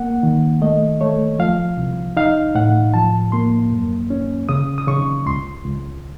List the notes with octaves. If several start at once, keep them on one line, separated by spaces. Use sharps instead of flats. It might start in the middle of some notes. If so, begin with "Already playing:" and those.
Already playing: A#3 F#5
D#3
A3 D#5
A3 C#5
F3 F5
C2
D#4 F5
A2 F#5
F3 A5
A#3 C6
F#2
C#4
C#3 D#6
D#6
C#3 C#6
C#2 C6
C#2